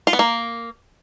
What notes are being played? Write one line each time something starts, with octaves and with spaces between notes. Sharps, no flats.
F4
B3
A#3